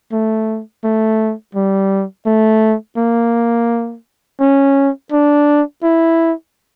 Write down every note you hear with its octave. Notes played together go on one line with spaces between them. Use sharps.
A3
A3
G3
A3
A#3
C#4
D4
E4